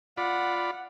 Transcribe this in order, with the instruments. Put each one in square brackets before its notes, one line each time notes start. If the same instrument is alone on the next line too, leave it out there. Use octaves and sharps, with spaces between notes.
[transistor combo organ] F4 D5 B5 [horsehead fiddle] F#5